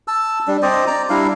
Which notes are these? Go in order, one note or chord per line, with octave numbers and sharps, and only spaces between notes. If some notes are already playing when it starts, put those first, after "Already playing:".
A5 E6
G3 D4
C4 C5 D5 D#5
D5 A#5
G3 D4 E4 F5